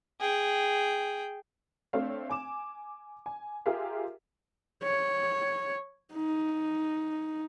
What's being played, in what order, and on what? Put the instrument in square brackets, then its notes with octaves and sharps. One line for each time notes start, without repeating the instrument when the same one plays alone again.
[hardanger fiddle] G#4 G5
[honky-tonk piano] A3 C4 D4 C#5 F5
G#5 D6 E7
G#5
F4 G4 G#4 A#4 E5 F5
[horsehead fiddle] C#5
D#4